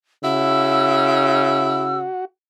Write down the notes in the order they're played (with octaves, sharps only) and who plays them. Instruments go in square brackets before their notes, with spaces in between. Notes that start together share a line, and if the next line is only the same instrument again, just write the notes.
[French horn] C#3 [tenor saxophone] E4 [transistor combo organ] F#4 [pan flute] E6